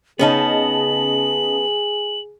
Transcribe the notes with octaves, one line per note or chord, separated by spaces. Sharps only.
C#3 B3 C#4 D#4 G#4 D#5 A5 F#7